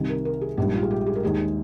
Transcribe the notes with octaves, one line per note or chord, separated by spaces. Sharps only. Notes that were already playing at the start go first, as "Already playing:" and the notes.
Already playing: C2 C3 D#3
A#4
A#4
G#4
A#1 G#2 G3 G4
F4
G#4
G4
G#4
A#4
D#2 D#3 G#3 G#4